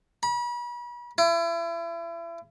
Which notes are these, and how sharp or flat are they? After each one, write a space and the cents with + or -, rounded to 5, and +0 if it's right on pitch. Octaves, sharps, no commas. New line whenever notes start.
B5 -40
E4 +35